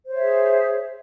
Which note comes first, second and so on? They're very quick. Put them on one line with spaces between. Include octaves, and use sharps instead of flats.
C5 C#5 E5 G#4